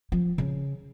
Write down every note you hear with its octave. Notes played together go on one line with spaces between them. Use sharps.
F3
C#3